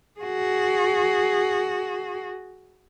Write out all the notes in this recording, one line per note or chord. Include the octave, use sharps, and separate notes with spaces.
F#4 G#4